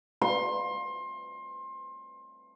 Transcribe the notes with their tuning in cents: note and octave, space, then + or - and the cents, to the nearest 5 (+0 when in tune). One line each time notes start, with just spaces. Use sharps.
C6 +25